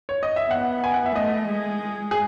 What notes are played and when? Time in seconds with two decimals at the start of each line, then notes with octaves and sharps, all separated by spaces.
0.09 C#5
0.23 D#5
0.36 E5
0.50 B3 F#5
0.84 G#5
0.94 F#5
1.06 E5
1.16 A3 D#5
1.49 G#3
2.11 G#4